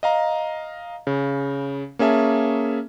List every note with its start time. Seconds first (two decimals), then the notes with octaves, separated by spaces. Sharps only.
0.03 D#5 F5 A#5
1.07 C#3
1.99 A#3 C#4 G#4 E5 A5